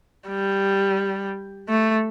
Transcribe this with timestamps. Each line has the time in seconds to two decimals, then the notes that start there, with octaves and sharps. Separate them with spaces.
0.29 G3
1.69 A3